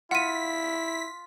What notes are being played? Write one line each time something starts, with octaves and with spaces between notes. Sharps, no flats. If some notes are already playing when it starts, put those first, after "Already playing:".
E4 F4 F#5 B6 D#7